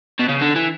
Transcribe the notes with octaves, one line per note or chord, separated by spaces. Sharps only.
B2
C#3
D3
E3